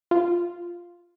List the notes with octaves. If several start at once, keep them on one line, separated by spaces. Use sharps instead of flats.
F4